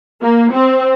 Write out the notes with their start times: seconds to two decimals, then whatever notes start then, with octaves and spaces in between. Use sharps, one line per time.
0.22 A#3
0.53 C4